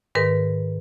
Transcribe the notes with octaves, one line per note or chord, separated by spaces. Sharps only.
G#2 D#3 A#4 B4